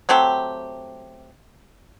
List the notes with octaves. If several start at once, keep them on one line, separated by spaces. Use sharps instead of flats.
F#3 A3 C4 G4